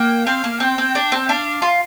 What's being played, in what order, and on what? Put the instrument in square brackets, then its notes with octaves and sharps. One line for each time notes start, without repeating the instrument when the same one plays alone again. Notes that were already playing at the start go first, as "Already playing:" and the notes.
Already playing: [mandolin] A#3 [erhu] G5
[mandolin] C4 [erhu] F5
[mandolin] A#3
[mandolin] C4 [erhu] G5
[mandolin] C4
D4
C4
[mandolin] D4 [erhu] F5
[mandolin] F4